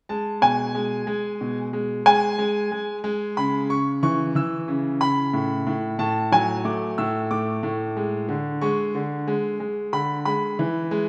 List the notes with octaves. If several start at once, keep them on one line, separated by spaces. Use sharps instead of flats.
G#3 A5
B2 G#5
G#3
G#3
B2
G#3
G#3 G#5
G#3
G#3
G#3
C#3 B5
C#3 C#6
E3 C#6
E3 E6
C#3
C#3 B5
A2
A2
A2 A5
F#3 G#5
A3 D6
A2 E6
A3 D6
A2
G#3
D3
G#3 C#6
D3
G#3
G#3
D3 B5
G#3 B5
E3
G#3